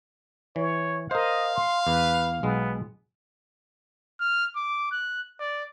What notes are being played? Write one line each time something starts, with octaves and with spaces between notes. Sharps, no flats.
E3 C#5
A#4 C5 D#5 F5
C6
E2 B4
B1 G#3 B3
F6
D6
F#6
D5